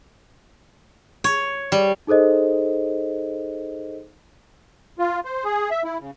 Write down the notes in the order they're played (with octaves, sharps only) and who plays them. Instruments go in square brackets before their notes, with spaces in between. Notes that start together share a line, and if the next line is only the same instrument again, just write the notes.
[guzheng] C#5
G3
[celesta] D#4 G#4 A4 C5 D#5
[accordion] F4
C5
G#4
E5
E4
C#3